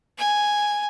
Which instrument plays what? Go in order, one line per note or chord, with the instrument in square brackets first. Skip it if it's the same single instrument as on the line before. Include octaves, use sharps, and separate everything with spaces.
[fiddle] G#5